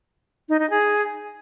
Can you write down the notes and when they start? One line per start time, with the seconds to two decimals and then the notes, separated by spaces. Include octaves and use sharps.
0.49 D#4
0.59 D#4
0.70 G#4